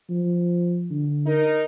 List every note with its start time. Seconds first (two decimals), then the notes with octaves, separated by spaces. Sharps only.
0.10 F3
0.90 D3
1.27 D#4 A#4